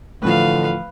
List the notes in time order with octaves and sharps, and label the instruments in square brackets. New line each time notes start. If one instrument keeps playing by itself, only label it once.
[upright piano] A2 E3 F3 [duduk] D3 [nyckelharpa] B4 F5